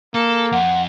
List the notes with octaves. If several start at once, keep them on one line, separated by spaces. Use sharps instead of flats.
A#3 A4
F2 F#5